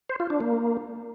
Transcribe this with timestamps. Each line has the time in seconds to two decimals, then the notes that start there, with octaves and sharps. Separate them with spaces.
0.09 C5
0.20 F4
0.30 D4
0.41 A#3